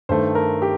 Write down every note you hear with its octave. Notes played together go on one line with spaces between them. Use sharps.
G2 D#3 A3 C5
A#4
G4